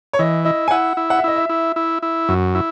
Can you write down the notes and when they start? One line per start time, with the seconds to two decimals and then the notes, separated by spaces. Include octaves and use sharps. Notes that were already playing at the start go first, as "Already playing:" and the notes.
0.13 C#5
0.19 E3 D#5
0.45 E4 D#5
0.68 G#5
0.71 E4 F#5
0.97 E4
1.10 F#5
1.19 E5
1.24 E4 D#5
1.36 E5
1.49 E4
1.76 E4
2.02 E4
2.29 F#2
2.55 E4